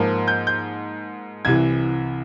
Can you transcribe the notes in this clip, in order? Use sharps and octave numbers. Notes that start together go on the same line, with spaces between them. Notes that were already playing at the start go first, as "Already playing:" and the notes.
Already playing: G#2 F3 A#3
G6
G6
C2 C3 E3 G#6